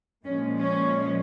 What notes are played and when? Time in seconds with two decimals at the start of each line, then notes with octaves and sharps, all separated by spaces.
0.25 A#2 F3 G#3 C#4
0.57 C#4